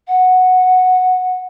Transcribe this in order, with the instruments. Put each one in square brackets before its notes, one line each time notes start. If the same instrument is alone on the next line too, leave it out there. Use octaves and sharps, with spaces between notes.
[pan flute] F#5